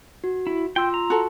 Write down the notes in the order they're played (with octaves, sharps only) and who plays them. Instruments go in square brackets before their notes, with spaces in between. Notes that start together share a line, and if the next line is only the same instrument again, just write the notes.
[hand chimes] F#4
[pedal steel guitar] E4
[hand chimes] F4 C6 E6 [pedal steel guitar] G5
[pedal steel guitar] A#5
[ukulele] F#4 A4